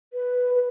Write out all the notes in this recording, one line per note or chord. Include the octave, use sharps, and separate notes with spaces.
B4
B4